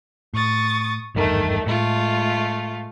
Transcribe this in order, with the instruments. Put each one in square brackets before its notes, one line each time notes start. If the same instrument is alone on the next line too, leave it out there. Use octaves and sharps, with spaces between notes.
[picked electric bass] A2 [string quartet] C#6 D#6 A6
[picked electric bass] G#1 E2 G2 [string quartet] D#3 A3
[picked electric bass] A2 [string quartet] G#3 A3 F4